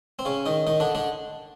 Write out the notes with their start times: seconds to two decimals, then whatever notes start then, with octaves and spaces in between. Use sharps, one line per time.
0.19 C4
0.25 C#3 C#4
0.46 D#3 D#4
0.67 D#3 D#4
0.80 D3 D4
0.95 D3 D4